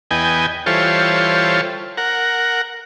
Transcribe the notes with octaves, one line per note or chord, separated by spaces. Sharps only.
E2 B3 D#5 G5 G#5
E3 G3 F4 A4 C5 C#5
A#4 F#5